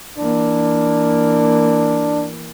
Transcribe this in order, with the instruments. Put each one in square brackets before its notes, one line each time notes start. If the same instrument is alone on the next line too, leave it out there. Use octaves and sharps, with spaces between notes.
[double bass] E3 A#3 [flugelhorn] D4